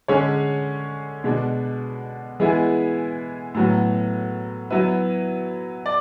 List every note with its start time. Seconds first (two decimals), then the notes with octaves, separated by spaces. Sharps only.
0.08 D3 G#3 C#4 G#4 C#5
1.24 B2 G#3 D4
2.40 E3 G#3 B3 E4 G#4
3.55 A2 F#3 B3
4.70 F#3 B3 E4 B4 E5
5.86 D5